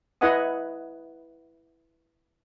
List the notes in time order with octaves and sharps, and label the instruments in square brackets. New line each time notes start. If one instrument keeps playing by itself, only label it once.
[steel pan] E4 B4 D#5 F#5 G#5 D#6